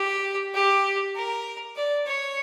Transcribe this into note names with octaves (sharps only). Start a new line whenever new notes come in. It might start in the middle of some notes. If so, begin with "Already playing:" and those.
Already playing: G4
G4
A#4
D5
C#5